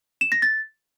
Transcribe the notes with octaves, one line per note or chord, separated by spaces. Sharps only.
E7
A#6
A6